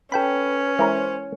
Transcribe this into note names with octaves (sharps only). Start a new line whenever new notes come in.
C#4 A4 B4 G5 B5
E3 G#3 A#4 C5 C#5